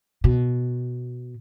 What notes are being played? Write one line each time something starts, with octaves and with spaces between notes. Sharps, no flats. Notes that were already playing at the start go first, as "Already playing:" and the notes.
B2